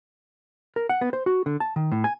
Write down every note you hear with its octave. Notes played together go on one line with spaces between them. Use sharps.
A#4
F#5
B3
C5
F#4
D3
A5
D#3
A2
G#5